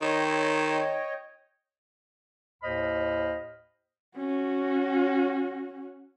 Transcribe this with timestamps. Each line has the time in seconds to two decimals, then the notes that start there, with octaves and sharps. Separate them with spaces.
0.02 D#3 C#5 D#5 G5
2.63 D#2 A2 C5 D#5 B5 F6
4.17 C#4 F#4